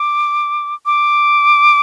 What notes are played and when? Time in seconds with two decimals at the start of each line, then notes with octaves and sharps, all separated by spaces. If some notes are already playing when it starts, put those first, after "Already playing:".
Already playing: D6
0.86 D6